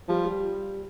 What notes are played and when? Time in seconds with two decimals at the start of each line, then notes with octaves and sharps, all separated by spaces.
0.09 F3 G3
0.25 G3